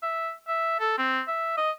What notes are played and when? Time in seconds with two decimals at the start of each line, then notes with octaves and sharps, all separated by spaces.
0.02 E5
0.47 E5
0.80 A4
0.98 C4
1.28 E5
1.57 D#5